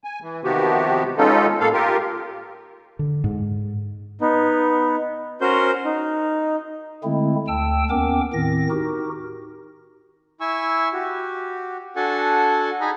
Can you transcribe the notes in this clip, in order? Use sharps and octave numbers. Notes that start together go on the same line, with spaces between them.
G#5
E3
C3 D#3 F3 B3 F#4 G4
G#3 B3 C#4 D#4 F4 A4
A2 A#3 A4 F5
F4 G4 A#4
D3
G#2
B3 D#4
C#4 F#4 A#4 C5 G6
D#4
D3 G#3 A3 C4 E4
D2 G5 A5 E6
D#2 B3 C#4 A#4 G5 D6
A2 D#3 C4 A#6
D#4 F#4 G4 A#4
E4 G#5 C#6 E6
F#4 G4
D4 F#4 A4 F#5 G#5 A5
D#4 G#4 G#5 A#5 B5